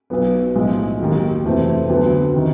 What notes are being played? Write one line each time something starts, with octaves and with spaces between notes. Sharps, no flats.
B1 B2 F#3 B3
B1 A2 F3 G#3
D#2 D#3 F#3
F2 C3 E3 A3 C4
D2 D3 F#3 B3
C3 D#3